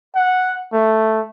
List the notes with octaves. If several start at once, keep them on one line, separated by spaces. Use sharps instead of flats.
F#5
A3